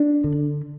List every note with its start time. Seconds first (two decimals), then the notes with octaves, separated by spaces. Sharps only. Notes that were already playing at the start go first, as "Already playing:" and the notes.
Already playing: D4
0.24 D3